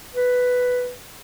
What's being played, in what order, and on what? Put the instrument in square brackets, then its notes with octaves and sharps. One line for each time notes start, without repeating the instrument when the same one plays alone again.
[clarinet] B4